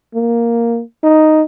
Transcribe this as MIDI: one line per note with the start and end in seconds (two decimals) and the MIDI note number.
0.15 0.81 58
1.04 1.42 63